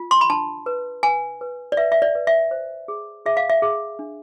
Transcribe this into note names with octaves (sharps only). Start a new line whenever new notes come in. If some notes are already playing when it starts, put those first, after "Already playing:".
Already playing: F4
C6
B5
D4 A5
B4
B4 G#5
B4
D5
B4 E5
E5
D5
B4
E5
C5
G#4
G#4 E5
F5
E5
G#4
D4